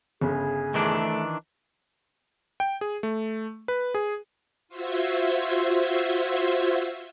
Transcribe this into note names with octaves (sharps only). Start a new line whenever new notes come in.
G1 C#3 G#4
D#3 E3 A3 D4
G5
G#4
A3
B4
G#4
F4 F#4 C5 E5 E6 G#6